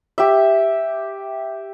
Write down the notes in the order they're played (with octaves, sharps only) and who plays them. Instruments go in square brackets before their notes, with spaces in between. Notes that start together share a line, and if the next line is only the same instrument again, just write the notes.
[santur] G4 E5